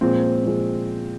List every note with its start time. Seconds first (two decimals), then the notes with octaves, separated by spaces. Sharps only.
0.01 A#2 F3 G#3 C4
0.44 A#2 F3 G#3